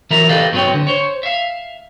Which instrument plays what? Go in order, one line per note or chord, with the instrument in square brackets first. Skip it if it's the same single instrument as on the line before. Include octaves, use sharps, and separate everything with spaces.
[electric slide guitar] E3 F#3 A#4 E5 A#5
G4 A4 B4 D5 D#5 F5
G2 F#3 C4 B4 C#5 G5
D3
C5 C#5
E5 F5